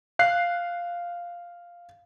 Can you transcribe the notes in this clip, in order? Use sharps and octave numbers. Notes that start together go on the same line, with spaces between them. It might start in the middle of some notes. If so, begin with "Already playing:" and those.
F5 F#6 C7